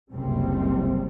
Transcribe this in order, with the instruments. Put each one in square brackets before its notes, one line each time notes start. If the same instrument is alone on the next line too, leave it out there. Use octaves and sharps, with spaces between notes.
[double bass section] F#1 C#2 C3 G3 C4